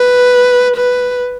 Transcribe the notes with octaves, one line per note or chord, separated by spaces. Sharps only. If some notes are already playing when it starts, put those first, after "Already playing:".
Already playing: B4
B4